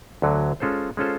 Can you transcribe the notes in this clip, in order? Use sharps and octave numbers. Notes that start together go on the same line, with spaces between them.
D2 D3 F#3
G#3 C#4 F4 A4 C5
G#3 C#4 F4 A4 C5